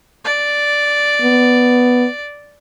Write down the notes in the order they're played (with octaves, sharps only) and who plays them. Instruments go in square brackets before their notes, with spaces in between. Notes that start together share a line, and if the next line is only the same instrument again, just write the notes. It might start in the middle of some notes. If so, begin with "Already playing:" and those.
[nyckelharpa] D5
[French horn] B3